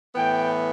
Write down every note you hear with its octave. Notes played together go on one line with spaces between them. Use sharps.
A2 E3 B3 G5